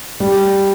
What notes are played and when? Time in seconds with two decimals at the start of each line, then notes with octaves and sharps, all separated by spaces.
0.20 G3